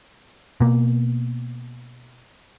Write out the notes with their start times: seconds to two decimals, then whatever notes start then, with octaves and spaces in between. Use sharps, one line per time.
0.61 B2 A#3